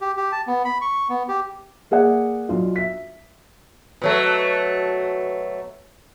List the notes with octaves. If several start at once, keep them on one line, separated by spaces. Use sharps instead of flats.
G4
G4
A5
B3
B5
C#6
B3
G4
A#3 G#4 D5 F#5
B1 D4 F4
E5 B6
B2 F#3 A3